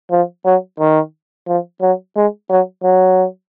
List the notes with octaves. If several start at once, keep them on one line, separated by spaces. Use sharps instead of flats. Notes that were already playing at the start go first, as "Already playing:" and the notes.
F3
F#3
D#3
F3
F#3
G#3
F#3
F#3